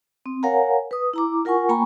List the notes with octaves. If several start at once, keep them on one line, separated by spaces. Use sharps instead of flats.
C4
A#4 C#5 F5 F#5 G#5 A#5
B4 D#6
E4 A#5 D6
F4 A#4 F#5 G#5 C#6
A#3 G5 G#5 A#5 B5 C#6